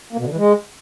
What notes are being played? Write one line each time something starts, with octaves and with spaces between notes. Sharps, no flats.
A#3
B2
D3
E3
G#3